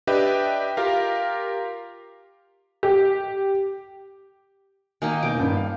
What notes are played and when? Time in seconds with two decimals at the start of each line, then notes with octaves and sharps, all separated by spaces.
0.07 D4 G4 B4 D#5 E5 G5
0.77 F4 G4 A#4 F5
2.83 G4
5.02 D#3 A#3 D#4 G#5
5.23 E1 D#5 D6 G6
5.40 G2
5.57 F5